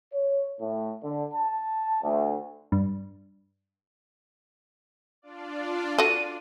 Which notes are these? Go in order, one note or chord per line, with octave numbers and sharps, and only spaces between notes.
C#5
A2
D3
A5
D2
G2
D4 F4 D5
F#4 A4 D#7